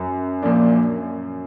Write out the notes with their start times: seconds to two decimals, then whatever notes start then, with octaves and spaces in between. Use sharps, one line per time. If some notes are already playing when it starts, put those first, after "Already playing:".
Already playing: F#2
0.42 A#2 F3 A#3 D4